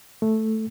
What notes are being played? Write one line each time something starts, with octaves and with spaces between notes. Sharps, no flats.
A3